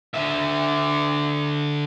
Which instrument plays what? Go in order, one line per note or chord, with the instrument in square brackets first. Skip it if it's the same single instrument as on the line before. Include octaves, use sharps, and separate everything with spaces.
[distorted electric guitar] D3 E5